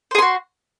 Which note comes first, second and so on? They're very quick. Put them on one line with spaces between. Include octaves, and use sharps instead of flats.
C5 G#4 C6 F#4